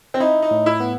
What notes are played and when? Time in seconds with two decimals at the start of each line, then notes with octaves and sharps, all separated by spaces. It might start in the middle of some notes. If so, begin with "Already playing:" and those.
0.14 C4
0.20 D#4 E4
0.42 D#4
0.51 A2
0.66 E4
0.80 B3